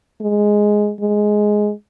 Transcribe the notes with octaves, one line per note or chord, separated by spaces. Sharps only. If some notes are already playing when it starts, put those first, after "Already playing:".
G#3
G#3